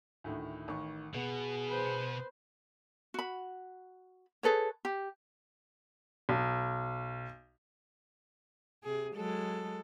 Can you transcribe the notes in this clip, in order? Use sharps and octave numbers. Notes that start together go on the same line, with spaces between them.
D2 A2 D#3
A1 D#3 C#6
B2 B3 G#4
B4 C5
F#4 B5
G#4 A4 B4 C#5
G4
B1
C3 G#4
F#3 G#3 A4